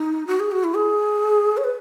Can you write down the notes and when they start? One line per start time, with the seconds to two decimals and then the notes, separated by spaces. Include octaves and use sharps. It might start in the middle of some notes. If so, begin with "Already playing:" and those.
Already playing: D#4
0.27 F#4
0.40 G#4
0.52 F#4
0.64 E4
0.75 G#4
1.57 C#5
1.64 B4